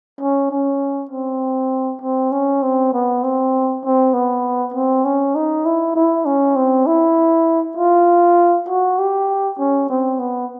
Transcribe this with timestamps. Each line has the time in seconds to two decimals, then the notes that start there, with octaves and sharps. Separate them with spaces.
0.21 C#4
0.51 C#4
1.11 C4
2.02 C4
2.32 C#4
2.62 C4
2.93 B3
3.23 C4
3.84 C4
4.13 B3
4.74 C4
5.05 C#4
5.35 D#4
5.66 E4
5.95 E4
6.25 C#4
6.56 C4
6.86 E4
7.77 F4
8.68 F#4
8.99 G4
9.58 C#4
9.90 C4
10.19 B3